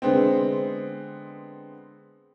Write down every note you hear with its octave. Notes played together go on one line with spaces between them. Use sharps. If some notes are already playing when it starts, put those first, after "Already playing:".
D3 G#3 B3 C4